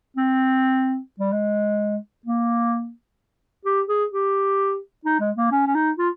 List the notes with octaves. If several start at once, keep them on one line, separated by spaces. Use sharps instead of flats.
C4
G3
G#3
A#3
G4
G#4
G4
D#4
G#3
A#3
C#4
C#4
D#4
F4